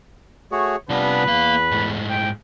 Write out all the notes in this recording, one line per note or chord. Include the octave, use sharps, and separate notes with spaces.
A3 F#4 G#4 C#5
C3 G3 B3 D4 F4 B4
E2 A#3 F5
G#2 A3
G5